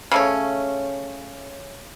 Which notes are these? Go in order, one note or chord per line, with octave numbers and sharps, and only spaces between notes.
C#3 A3 C#4